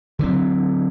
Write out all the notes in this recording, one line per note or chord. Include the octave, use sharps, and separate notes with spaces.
D3 E3 F#3 C4